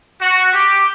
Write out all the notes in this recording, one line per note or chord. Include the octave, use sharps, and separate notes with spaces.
F#4
G4